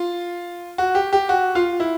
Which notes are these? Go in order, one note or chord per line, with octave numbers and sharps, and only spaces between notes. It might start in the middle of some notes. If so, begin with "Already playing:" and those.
Already playing: F4
F#4
G4
G4
F#4
F4
E4